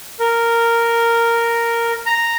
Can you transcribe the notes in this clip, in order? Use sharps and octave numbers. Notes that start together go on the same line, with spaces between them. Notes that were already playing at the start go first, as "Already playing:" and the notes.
A#4
A#5